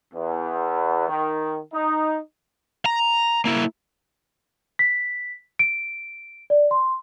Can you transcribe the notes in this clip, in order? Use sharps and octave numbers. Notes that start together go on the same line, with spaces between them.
E2
D#3
D#4
A#5
A#3 E4
B6
D7
D5
C6